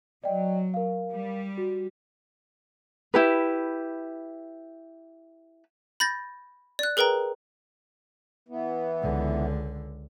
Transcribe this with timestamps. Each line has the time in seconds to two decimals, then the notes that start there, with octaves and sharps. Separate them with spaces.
0.24 F#3 D5 D#5 G5
0.74 A#4 F5
1.12 G3
1.58 F#4
3.14 E4 G4 B4
6.00 B5 G6 A6 A#6
6.79 D5 F#6
6.97 G#4 A#4 B4 G5 A#5
8.49 E3 B3
9.02 C#2 D3